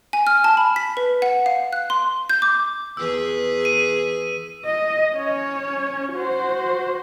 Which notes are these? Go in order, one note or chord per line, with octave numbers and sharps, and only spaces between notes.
G#5
F6
A5
B5
B6
B4
F#5
F5
F#6
C6
G6
D6
E2 G#4 B4 E6
D#7
D#5
C#4 C#5
F#4 C5